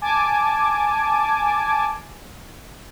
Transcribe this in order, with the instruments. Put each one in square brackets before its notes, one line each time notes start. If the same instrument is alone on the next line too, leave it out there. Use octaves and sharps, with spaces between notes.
[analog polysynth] G#5 A5 D6